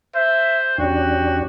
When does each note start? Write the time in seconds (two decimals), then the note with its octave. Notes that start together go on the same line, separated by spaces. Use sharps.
0.14 C5 E5
0.78 E2 C#4 D4 F#4 G4